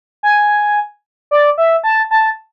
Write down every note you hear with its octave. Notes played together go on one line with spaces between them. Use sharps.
G#5
D5
E5
A5
A5